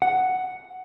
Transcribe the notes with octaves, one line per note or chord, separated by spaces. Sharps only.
F#5